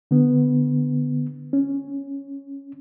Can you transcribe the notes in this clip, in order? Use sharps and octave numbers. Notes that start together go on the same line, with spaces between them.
D3 B3
C#4